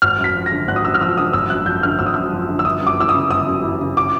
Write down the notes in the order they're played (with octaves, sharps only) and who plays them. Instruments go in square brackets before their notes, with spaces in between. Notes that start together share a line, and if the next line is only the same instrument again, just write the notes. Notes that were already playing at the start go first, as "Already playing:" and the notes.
[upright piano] G#1 [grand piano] F6
[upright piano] F#2
[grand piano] B6
[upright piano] F3
[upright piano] D3 [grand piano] A#6
[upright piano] G#1 [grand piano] F#6
[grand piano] D#6
[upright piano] F#2 [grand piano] E6
[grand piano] F6
[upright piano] F3 [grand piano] E6
[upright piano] D3 [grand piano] D#6
[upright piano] G#1 [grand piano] E6
[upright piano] F#2 [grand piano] F#6
[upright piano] F3 [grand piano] G6
[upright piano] D3 [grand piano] F6
[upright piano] G#1 [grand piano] E6
[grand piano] D#6
[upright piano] F#2 [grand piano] E6
[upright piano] F3
D3
[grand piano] E6
[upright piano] G1 [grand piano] D#6
[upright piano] F#2
[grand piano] D6
[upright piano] E3 [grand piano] E6
[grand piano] D#6
[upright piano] C#3
[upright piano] G1 [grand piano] D#6
[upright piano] F#2
E3
C#3
[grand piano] D6